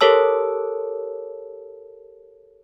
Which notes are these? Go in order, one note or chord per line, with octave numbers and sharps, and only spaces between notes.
G4 A4 A#4 C#5 A5 E6